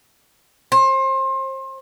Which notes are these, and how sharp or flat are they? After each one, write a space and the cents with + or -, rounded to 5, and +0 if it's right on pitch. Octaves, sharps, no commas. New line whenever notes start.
C5 +30